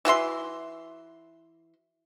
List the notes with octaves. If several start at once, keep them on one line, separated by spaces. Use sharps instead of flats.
E3 F#4 E5 C6